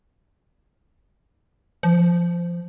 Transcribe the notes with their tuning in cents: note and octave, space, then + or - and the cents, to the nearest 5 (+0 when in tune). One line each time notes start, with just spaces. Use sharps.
F3 -15